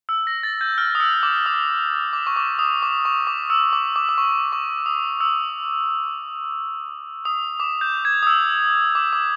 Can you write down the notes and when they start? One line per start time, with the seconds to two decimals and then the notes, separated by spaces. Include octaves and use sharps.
0.09 E6
0.27 A#6
0.43 A6
0.61 G6
0.78 F6
0.95 D#6
1.00 E6
1.23 D6
1.46 D#6
2.13 D6
2.27 C#6
2.36 D6
2.59 D#6
2.83 D6
3.05 C#6
3.27 D6
3.50 E6
3.73 D6
3.96 D6
4.09 D6
4.18 C#6
4.52 C#6
4.86 D#6
5.21 E6
7.25 D#6
7.60 D6
7.81 G6
8.05 G#6
8.23 D#6
8.27 E6
8.95 D6
9.13 D6